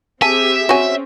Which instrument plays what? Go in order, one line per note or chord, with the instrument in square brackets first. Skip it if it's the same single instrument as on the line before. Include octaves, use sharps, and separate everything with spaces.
[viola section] C4 G4 G#4 [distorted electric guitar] E5 [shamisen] G#5 A5 [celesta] D#7
[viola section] C4 C#4 [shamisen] F#4 G#5 [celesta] C#5